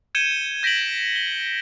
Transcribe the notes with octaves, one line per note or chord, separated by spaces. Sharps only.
G6 G#6 C#7 D#7 E7 G7
G6 A#6 B6 D7 D#7 F#7
G7